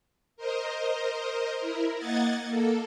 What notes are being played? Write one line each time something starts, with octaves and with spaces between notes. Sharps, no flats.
A#4 C5 D#5
E4 A#4
A#3 D#5 F#5 G#6 A6
A#3 A4